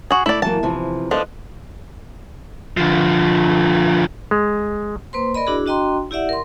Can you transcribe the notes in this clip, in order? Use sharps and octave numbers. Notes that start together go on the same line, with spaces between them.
F#4 G#4
A3 E4 D5
E3 F#3 A#3 A5
C3 E3 F3
F3 D4 A4 B4 D#5
D3 F3
G#3
A#3 B4 C5 C6
A#4 D5 D#5 B5
D4 E4 F#4 G#4
D4 F#4 D#5 G5 A#5 C6
E4 G4 D5 E5 F#5
A#4 C6